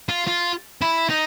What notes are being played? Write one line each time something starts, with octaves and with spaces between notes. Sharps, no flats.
F4
F4
E4
D#4